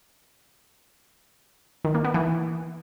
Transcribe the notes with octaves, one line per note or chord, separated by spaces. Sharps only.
D#3
A#3
B3
E3